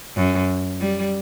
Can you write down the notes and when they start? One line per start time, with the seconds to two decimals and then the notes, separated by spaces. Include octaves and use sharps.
0.16 F#2
0.80 G3